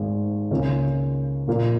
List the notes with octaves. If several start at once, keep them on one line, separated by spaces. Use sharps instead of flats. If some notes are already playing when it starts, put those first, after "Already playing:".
Already playing: G#1 G#2 G#3
C#2 C#3 A#3 C#4
A#2 F3 A#3